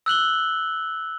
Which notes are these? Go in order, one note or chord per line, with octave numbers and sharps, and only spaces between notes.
E6 F#6 F#7 G7